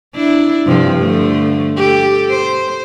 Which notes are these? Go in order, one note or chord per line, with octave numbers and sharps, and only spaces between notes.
D4 E4
G2 C3 F3
D3 F3 A3
G4 A4
C5